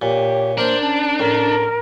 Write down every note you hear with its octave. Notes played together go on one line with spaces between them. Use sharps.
A#2 G4 C#5
A#3 D4 A#4 C5
C#4 A5
A2 A#4